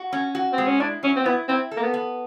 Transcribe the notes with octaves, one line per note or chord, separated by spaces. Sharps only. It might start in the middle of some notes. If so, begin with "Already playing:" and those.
Already playing: F#4
C#4
F#4
C4
G#3
C#4
D4 E4
F#3 C#4
C4
B3 E4
C4 E4
A4
A#3
B3
B3